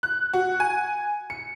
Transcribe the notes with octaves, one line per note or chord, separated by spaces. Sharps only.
F#6
F#4
G#5
C#7